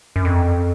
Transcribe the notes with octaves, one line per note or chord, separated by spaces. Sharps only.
F#2
F2